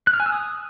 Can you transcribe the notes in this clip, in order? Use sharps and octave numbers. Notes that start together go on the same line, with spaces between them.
F#6
F6
G#5
E6
D#6